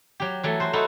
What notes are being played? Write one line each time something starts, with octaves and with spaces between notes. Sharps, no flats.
F#3 G4
E3 F#3 A3
F#4 C5
A3 D#4 E4 F#4